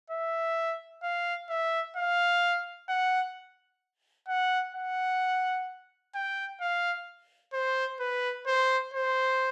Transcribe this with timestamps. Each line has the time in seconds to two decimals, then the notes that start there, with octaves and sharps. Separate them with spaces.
0.10 E5
1.03 F5
1.49 E5
1.96 F5
2.89 F#5
4.28 F#5
4.75 F#5
6.15 G5
6.61 F5
7.53 C5
8.00 B4
8.47 C5
8.94 C5